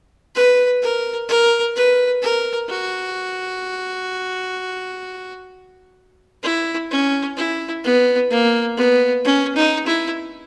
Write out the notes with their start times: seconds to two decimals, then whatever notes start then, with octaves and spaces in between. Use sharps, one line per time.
0.35 B4
0.82 A#4
1.29 A#4
1.76 B4
2.22 A#4
2.69 F#4
6.43 E4
6.91 C#4
7.37 E4
7.84 B3
8.30 A#3
8.77 B3
9.24 C#4
9.55 D#4
9.87 E4